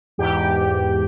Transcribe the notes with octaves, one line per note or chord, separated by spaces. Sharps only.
E2 G#2 G4 G5